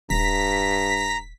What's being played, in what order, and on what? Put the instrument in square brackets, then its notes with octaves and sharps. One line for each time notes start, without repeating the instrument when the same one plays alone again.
[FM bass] D#1 [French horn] G2 [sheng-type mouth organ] A#5 [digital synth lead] B6